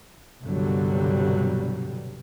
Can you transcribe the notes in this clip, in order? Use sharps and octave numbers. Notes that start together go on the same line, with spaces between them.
C2 G2 B2 D3 F#3 G3